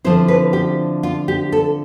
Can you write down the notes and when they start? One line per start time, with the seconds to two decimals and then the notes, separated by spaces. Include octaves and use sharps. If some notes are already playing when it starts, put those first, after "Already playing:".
0.04 D3 F3 C4 E4 C5
0.28 B4
0.53 G4
1.03 F4
1.28 G4
1.52 A4